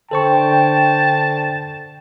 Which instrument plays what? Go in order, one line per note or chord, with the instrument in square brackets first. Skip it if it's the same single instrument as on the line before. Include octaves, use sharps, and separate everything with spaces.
[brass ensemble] D3 G5 [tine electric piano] A4 C5 C#6 [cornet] A5